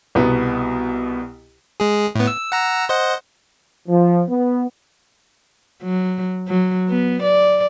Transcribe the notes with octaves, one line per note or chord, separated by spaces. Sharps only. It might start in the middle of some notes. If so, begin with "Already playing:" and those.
C2 B2 B3
G#3 G#4
A2 B3
E6
F#5 A#5 E6
C5 D#5 F#5
F3
B3
F#3
F#3
B3
D5